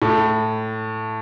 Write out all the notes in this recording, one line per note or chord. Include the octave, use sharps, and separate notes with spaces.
A2